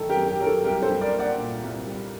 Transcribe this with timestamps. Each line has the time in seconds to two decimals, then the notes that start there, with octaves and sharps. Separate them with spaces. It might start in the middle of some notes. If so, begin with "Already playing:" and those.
Already playing: D#3 F#3 A3 A4
0.09 G4 A#4
0.15 F#2
0.28 G4
0.40 F#3 A#4
0.47 A4
0.64 C2 G4 A#4
0.82 A4 C5
0.89 G3
1.01 A#4 D5
1.13 A#3
1.20 D5 F#5
1.38 A#2
1.62 C2
1.87 G3